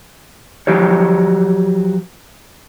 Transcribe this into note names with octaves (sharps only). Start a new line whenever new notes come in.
F3 F#3 G4 C#5